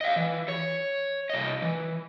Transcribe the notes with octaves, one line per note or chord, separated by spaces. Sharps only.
D#5 F5
E3
C#5
C2 D#5
E3